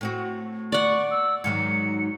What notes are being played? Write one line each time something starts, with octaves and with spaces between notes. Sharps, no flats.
A2 C4 F#4
D5 F#5 C#6
E6
G#2 D#3 F#3 C#7